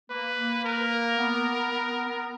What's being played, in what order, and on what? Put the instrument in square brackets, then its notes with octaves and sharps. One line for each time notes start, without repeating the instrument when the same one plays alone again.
[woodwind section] A#3 [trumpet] B4
[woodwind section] A#3
[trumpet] A#4
[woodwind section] B3
B3
B3
B3